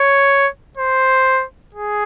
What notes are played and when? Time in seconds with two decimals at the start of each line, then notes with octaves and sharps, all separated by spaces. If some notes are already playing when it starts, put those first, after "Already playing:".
Already playing: C#5
0.77 C5
1.75 G#4